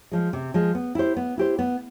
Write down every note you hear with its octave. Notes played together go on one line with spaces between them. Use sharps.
F3 G#3
C3
F3 G#3
B3
E4 G4 C5
B3
E4 G4 C5
B3